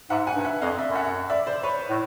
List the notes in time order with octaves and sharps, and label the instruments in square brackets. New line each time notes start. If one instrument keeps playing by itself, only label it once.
[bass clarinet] G#2 [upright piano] E5 F#5
[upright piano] F#5 G#5
[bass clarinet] G2
[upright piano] E5 F#5
[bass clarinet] F2 [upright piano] D#5 F5
[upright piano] D5 E5
[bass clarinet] F#2
[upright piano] E5 F#5
D5 E5
C5 D5
B4 C#5
[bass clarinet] A2